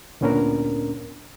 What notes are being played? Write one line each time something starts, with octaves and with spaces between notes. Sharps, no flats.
D2 A#2 B3 C#4 D4 A#4